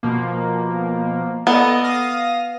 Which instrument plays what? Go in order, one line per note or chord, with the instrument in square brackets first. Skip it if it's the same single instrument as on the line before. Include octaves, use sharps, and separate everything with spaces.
[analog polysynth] B2 F3 A#3
[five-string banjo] B3 [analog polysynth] A4 D5 D#5
[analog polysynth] F5 D#6 A#6